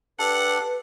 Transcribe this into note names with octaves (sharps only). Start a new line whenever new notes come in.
D4 G4 A4 B4 F#5 A5